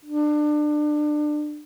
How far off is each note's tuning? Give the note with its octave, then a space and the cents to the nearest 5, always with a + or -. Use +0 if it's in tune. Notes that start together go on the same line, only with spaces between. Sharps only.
D4 +25